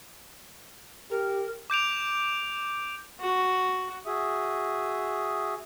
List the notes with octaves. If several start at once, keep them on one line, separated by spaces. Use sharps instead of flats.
G4 A#4
D6 G6 D7 F7
F#4
F#4 G#4 E5 D#6